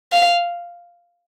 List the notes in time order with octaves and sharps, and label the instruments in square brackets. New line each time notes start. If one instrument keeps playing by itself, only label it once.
[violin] F5